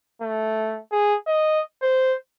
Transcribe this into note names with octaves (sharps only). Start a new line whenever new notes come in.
A3
G#4
D#5
C5